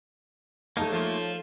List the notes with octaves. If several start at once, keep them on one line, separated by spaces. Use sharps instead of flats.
A3 A#3 D#4 A4 C#5 A5
F3